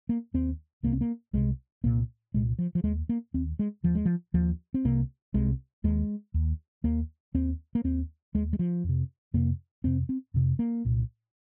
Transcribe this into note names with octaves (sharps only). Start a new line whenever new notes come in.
A#3
D#2 C4
C2 C3 A#3
C4
A#3
C2 C3 G#3
C2 A#2 A#3
C2 A#2 G#3
F3
F3
D#2 G#3
A#3
D#2 C4
G#3
D#2 F3
G#3
F3
D#2 F3
C4
C2 C3 A#3
C2 C3 G#3
D#2 G#3
D#2
D#2 A#3
D#2 C4
A#3
D#2 C4
D#2 G#3
G#3
F3
F2
C3
F2 C3 A#3
F2 C3 C4
C4
F2 C3
A#3
C2 A#2